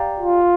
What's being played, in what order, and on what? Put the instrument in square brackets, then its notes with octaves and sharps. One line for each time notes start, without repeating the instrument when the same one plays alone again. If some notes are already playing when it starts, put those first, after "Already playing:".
Already playing: [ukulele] G4 D5 F5 A#5
[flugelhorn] F4